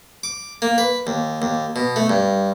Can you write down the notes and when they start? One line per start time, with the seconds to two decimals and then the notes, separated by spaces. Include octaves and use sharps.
0.23 D6
0.62 A#3
0.78 B4
1.07 D#2
1.42 D#2
1.76 B2
1.96 A3
2.10 G2